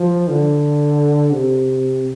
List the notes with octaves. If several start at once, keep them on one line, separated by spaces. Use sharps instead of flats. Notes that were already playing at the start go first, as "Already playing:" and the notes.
Already playing: F3
D3
C3